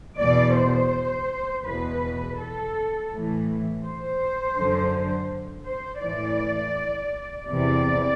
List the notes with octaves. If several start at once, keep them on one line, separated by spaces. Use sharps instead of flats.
E2 B2 D5
C5
E2 B2 B4
A4
A2 E3
C5
F#2 D3
C5
A2 E3 D5
E2 C3 E3 D5